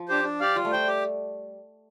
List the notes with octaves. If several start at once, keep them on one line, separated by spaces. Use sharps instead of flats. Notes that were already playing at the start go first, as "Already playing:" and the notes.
Already playing: F3
D4 G4 C5
D4
G4 D5 F5
G3 F4
A3
G3 C5 G5
G4